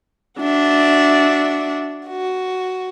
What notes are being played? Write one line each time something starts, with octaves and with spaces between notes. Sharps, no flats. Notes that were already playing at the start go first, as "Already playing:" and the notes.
D4 F#4 E5
F#4